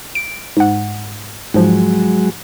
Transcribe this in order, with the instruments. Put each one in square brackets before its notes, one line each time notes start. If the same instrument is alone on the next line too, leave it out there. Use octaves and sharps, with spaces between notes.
[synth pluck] D7
G#2 F#5
[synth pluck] G#2 F3 [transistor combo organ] F#3 G#3